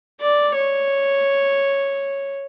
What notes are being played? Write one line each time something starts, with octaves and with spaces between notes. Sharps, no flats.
D5
C#5